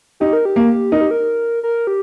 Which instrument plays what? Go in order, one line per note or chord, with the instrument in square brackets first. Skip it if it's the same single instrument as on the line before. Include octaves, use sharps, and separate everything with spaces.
[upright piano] D#4 [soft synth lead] G4
[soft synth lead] A#4
G4
[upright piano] A#3
[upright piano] D#4 [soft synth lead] A#4
[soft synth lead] G4
A#4
A#4
G4